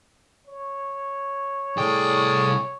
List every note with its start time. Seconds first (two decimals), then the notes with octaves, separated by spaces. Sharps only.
0.47 C#5
1.77 C2 A2 G#4 D5 G5